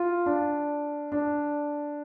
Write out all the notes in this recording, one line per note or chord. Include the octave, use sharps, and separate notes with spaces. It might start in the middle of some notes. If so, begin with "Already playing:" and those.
Already playing: F4
D4
D4